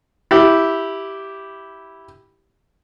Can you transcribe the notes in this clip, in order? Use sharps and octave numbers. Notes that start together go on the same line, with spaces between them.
E4 G4